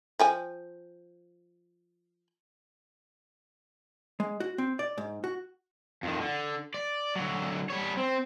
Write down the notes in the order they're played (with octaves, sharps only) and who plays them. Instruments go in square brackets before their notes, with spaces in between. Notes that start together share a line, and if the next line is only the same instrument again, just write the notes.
[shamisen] F3 G5 G#5
[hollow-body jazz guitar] G#3
F#4
C4
D5
G#2
F#4
[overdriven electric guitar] F2 D#3
D3
D5
D3 F#3
G3 C#5
C4